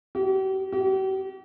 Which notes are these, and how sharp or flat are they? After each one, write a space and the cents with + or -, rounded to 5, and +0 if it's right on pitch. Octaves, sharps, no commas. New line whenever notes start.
G4 -45
G4 -45